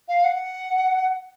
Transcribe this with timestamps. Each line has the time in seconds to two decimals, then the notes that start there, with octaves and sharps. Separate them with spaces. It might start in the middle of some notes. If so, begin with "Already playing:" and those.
0.08 F5
0.24 F#5